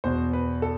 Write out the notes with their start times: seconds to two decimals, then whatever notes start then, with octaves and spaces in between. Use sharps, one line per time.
0.04 E2 B2 C5
0.33 B4
0.62 A4